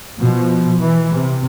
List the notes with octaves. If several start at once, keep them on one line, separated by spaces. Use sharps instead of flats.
B2 F3
E3
C3